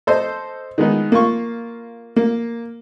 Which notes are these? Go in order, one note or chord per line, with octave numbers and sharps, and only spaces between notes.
A4 C5 D#5
D#3 G#3 B3 D#4
A#3 F4 C#6
A#3